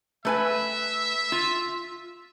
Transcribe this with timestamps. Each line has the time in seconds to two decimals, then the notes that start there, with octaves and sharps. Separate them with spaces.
0.25 A3 B4 E5 G#5
1.32 F4